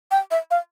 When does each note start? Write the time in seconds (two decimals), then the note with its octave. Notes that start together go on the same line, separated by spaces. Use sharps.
0.11 G5
0.31 E5
0.51 F5